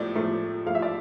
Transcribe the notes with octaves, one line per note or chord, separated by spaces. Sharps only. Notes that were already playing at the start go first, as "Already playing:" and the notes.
Already playing: A2 F3 A3 D5
A2 F3 A3
A2 F3 A3 F5
E5
D5